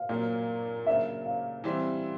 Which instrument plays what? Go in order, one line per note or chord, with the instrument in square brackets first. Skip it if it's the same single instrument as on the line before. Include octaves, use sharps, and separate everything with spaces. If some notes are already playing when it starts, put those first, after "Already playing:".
Already playing: [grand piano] F5
[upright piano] A#2 F#3 A#3
[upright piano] C#3 F#3 A#3 D4 [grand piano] E5
[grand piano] F5
[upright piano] E3 G3 C4 E4